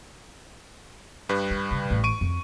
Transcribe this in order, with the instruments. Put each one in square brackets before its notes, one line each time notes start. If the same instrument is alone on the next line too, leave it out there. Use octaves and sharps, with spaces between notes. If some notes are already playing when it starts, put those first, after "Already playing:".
[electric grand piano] G2 G3 B4
[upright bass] D4
C#3
A1 C#4
[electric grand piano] C#6 D7 D#7
[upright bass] F2